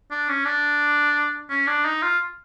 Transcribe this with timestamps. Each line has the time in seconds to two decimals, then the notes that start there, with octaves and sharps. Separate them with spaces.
0.11 D4
0.29 C#4
0.45 D4
1.50 C#4
1.67 D4
1.85 D#4
2.02 F4